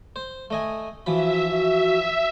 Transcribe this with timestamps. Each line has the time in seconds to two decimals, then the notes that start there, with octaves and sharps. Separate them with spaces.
0.16 C5
0.51 A3 D#5 G#5
1.06 E3 F3 F#4 E5 B5
1.49 F#4 E5